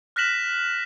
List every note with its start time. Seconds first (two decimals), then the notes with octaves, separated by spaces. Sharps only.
0.16 F6 F#6 A#6 B6 E7 F#7